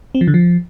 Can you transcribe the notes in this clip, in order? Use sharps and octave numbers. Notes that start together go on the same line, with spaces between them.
C4
F3
D3
F3